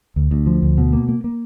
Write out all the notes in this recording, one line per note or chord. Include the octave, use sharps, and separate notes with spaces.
D2
D2
F3
D2
B2
A#3
A#3
A#3